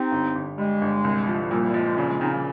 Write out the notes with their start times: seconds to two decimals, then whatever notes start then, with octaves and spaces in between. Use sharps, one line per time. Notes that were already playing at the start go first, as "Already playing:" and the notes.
Already playing: C4 D#4 G4
0.12 G1
0.35 G1
0.58 G3 G#3
0.82 G1
1.04 C2
1.27 F3
1.51 A#2 G3
1.74 F3 G#3
1.97 C#3 G3
2.09 G#3
2.20 C#3 C4 D#4
2.32 G3 A#3